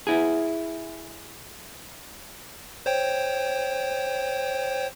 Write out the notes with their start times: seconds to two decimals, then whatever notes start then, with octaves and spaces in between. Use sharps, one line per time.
0.07 E4 G#4
2.86 C5 C#5 G5